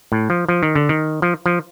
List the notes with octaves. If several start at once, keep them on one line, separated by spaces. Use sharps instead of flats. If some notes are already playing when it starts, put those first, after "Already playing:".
A2
F3
F3
D#3
D3
D#3
F3
F3